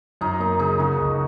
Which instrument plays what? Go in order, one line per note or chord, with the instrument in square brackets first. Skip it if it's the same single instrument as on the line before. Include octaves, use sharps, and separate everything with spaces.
[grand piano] F#2 [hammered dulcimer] D#4
[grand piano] A#3 [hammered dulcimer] D#4
[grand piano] C#3 [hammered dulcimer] D#4
[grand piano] C#3 [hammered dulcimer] F#4
[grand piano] C#2